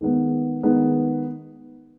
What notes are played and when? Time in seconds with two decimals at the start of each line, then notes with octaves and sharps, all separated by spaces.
0.01 D#3 G#3 B3
0.63 D#3 G#3 B3